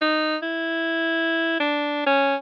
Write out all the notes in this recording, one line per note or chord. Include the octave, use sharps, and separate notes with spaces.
D#4
E4
D4
C#4